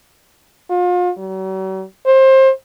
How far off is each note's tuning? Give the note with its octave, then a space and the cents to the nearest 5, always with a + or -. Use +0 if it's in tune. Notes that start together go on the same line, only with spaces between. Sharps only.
F4 +35
F#3 +45
C5 +25